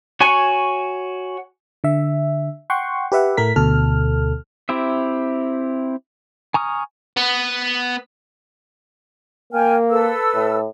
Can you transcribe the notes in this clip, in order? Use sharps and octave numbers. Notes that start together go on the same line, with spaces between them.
F#4 C#5 G#5 C#6
D3 E5
F#5 G5 C6 C#6
G4 B4 E5 F#5
A2 A3 A#4 B6
D2 B2 A4 F6
C4 E4 G4 E5
G#5 A#5 C#6 D#6 F6
B3
A#3 G5 G#5 F6
A4 B4 E6
A2